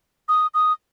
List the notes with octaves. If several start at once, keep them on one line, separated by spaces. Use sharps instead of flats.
D#6
D#6